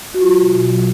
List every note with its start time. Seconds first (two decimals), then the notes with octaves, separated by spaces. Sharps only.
0.14 F#4
0.21 F#3 F4
0.38 B2
0.53 B2
0.70 F#3